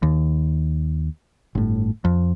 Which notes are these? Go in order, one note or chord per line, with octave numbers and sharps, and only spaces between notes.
D#2
G1 A2
F2